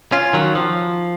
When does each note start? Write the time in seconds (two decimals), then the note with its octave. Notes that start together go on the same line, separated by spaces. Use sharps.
0.12 C#4 F4
0.33 D#3 F#3
0.55 F3